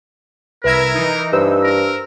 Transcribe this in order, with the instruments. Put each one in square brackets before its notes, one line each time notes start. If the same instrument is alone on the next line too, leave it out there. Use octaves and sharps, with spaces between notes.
[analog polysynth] C2 E5 G#6 [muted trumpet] A#4 [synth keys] B4
[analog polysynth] E3 D#4
[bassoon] G2 [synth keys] C5 E6
[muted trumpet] A#4